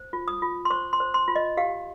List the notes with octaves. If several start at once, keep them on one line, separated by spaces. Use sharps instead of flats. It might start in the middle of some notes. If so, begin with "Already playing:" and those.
Already playing: C5
F4
D#6
F4
C6
C5 C#6
C6
C5
C6
F4
D#5
G4 F5